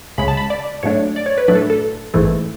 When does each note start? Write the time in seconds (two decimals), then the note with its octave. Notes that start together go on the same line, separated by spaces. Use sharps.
0.18 C#2 C#3 G#3 B5
0.28 A5
0.37 B5
0.50 D5
0.83 G#2 F#3 A3 D4 C#5
1.16 D5
1.26 C#5
1.38 B4
1.48 A2 F#3 A3 D4 B4
1.55 A4
1.70 A4
2.14 A1 G#2 E3 A3